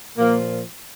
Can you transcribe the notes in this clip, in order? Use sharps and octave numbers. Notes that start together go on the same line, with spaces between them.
A#2 F3 A#3